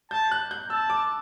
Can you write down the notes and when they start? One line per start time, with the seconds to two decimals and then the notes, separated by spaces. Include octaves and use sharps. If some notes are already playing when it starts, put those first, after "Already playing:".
0.11 A5 G6
0.31 F#6
0.51 G6
0.70 A5 E6
0.90 D6